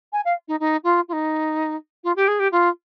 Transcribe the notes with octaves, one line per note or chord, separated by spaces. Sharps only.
G#5
F5
D#4
D#4
F4
F4
D#4
F4
G4
G#4
G4
F4